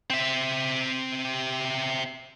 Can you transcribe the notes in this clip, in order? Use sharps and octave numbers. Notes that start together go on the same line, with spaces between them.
C4 E5